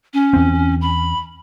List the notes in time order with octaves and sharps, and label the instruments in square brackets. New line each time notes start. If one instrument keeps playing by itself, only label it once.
[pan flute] C#4
[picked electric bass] E2 C4
[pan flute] B5